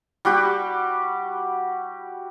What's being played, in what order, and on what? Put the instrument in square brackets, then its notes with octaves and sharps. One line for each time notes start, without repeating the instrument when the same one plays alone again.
[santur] G3 F#4 G4